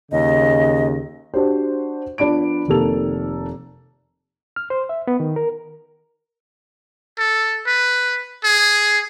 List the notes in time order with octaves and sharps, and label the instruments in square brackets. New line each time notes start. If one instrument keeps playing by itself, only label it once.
[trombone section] D#2 C#3 [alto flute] D#5
[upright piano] D4 F#4 G4 C5
F3 B3 D4 D5 B5 D7
F1 D#3 A#3 A4 F7
[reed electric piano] F6
C5
E5
B3
D#3
A#4
[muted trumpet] A4
B4
G#4